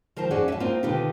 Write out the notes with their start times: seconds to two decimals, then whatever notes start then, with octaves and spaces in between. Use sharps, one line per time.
0.16 D#3 F3 A#4 C5 A5
0.31 F2 C#4 F#4 G#4 D5
0.48 E5 A5
0.60 A#3 C4 D#4 F4
0.83 B2 D3 D#3 D#4 F4 G4